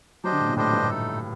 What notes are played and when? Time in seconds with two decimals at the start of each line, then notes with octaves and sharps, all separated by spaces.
0.24 F#3 D4 G4 C5 D#5
0.32 D3
0.41 A2
0.49 A#2
0.56 A2 D4 G4 C5 D#5
0.73 G2
0.89 A3 D#4 A4